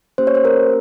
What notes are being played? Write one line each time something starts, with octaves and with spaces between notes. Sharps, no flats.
A#3 C#4 G4 C5
C#5
C5
A#4